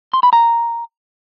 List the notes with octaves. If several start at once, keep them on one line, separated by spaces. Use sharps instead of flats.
C6
B5
A#5